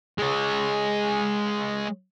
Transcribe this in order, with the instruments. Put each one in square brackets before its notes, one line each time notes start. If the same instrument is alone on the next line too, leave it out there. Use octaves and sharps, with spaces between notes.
[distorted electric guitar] G#3 C#5